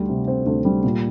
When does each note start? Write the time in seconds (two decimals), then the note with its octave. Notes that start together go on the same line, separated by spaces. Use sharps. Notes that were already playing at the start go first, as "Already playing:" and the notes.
Already playing: D2 G3
0.09 C3
0.28 C4
0.47 D2
0.65 G3
0.84 A#2